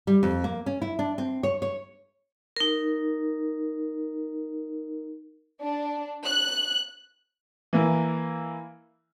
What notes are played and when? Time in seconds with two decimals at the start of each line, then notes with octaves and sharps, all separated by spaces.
0.07 G3
0.23 F2
0.44 A#3
0.66 C#4
0.82 E4
0.99 D4
1.18 C4
1.43 C#5
1.62 C#5
2.57 D#4 A#4
5.62 D4
6.24 F#6
7.73 E3 A#3 E4